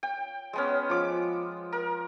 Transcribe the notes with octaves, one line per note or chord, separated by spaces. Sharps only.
G5
G#3 B3 C#4
F3 D6
A#4